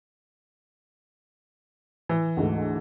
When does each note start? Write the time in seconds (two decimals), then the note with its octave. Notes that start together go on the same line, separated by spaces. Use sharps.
2.09 E3
2.37 D2 G#2 A3